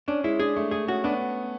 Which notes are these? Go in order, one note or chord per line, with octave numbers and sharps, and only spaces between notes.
C#4 D4
G#3 E4
D4 G#4
A3
A3 G#4
C#4 F#4
B3 D4